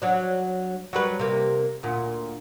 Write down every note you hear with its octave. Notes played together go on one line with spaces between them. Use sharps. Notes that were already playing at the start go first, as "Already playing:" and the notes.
F#3 D4
F#3 G3 B4
C3 A#3
D2 A#2